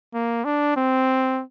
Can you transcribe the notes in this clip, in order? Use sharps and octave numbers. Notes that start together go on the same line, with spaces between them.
A#3
D4
C4